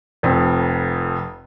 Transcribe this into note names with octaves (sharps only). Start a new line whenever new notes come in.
F1 F2